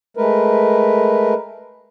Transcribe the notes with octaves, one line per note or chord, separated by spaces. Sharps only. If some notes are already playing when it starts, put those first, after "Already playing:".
G#3 A3 A#4 B4